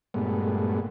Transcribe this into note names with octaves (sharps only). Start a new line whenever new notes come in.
G2 A#2 G#3 A3 B3